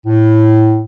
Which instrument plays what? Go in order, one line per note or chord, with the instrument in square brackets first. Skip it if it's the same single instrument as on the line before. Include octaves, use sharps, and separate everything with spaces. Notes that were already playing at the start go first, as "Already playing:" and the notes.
[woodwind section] A2